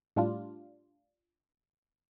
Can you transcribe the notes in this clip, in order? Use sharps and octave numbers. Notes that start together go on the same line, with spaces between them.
A2 G3 D4 F4